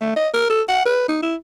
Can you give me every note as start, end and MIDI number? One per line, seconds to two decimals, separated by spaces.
0.01 0.14 57
0.16 0.28 75
0.34 0.49 70
0.50 0.62 69
0.69 0.83 78
0.85 1.07 71
1.08 1.19 63
1.22 1.36 64